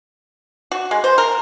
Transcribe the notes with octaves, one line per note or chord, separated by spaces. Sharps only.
F#4
G#3
C5
A#4